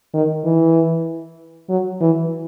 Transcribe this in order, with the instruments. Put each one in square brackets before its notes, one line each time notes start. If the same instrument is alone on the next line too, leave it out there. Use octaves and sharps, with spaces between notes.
[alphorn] D#3
E3
F#3
E3